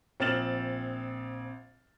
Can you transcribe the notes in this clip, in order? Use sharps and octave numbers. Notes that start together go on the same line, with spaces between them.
A#1 C4 F6 A6 E7 F#7